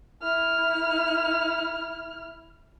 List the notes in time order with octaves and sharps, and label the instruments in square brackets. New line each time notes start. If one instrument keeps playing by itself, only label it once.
[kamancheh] E4 F6